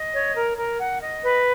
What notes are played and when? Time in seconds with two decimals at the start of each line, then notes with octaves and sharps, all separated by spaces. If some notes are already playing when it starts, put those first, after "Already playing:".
Already playing: D#5
0.14 C#5
0.36 A#4
0.58 A#4
0.80 F#5
1.01 D#5
1.23 B4